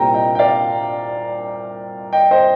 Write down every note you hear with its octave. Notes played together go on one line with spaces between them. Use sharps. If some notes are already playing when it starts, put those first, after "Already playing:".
Already playing: C2 A#2 G3 C4 G5 A#5
D#5 G5
G5
D5 F5
D#5 G5
C5 D#5